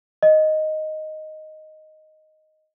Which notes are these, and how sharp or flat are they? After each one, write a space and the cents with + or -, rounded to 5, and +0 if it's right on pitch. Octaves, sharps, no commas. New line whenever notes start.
D#5 +0